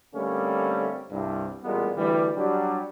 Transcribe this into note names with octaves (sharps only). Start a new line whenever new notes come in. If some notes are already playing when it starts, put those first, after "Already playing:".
D3 G3 A3 A#3 C4 C#4
C2 G2
A1 A#2 G3 G#3 A#3 B3
D2 E3 G3
F#3 G3 D4